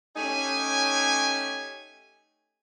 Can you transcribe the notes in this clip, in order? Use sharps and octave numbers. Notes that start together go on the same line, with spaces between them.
A3 C#4 D#4 G4 G#5